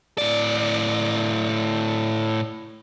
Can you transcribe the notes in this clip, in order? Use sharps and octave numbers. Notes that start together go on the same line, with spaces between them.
A2 D5